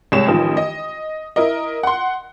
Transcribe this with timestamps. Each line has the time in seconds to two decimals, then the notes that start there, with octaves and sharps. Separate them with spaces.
0.12 C2 G#3 C#5 E7
0.27 A1 D#3 F3
0.57 D#5
1.36 E4 A#4 D#5
1.83 F#5 C6